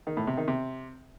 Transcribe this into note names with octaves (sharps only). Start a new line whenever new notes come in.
D#3
A2
C3
D#3
C3